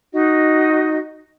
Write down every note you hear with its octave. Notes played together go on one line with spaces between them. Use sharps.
D#4 F#4 D#5